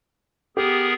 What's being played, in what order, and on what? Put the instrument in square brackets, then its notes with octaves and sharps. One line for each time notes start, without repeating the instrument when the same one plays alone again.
[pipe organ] B3 G#4 A#4 [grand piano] G4